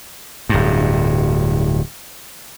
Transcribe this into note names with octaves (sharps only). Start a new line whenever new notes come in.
D1 G2